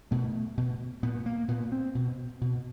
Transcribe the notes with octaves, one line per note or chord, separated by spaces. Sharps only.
B2 A3
B2
A#2 B3
A#3
A#2 B3
C4
B2
B2